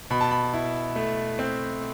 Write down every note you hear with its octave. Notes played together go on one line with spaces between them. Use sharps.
B2 B5
A5
B5
E4
A3
C4